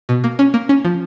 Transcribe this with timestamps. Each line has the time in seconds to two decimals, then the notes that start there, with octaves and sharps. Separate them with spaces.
0.09 B2
0.24 A#3
0.39 C#4
0.54 A#3
0.69 C#4
0.85 F3